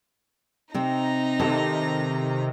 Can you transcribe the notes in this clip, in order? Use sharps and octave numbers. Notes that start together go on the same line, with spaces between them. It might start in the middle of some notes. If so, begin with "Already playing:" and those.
C3 C4 D#4 A#5
C3 D#3 A4